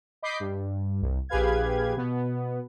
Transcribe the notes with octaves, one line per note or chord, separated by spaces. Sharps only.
D#5 B5 D6 G6 B6 C7
G2
C2
A#1 G4 G#4 B4 F5 G#6
B2 B3